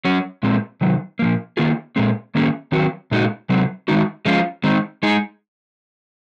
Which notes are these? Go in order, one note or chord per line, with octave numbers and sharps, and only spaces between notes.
F#3 C#4 F#4
A#2 G#3 C4
C3 D#3 F#3
A#2 F3 A#3
D#3 A#3 F4 G#4
A#2 G#3 C4
D#3 A#3 C#4 G#4
D#3 F#3 C4 F#4
A#2 G#3 D#4 F#4
C3 F#3 C4
D#3 G#3 D#4 F#4
F3 G#3 C#4 F4
D#3 G#3 C4 D#4
G#3 D#4 G#4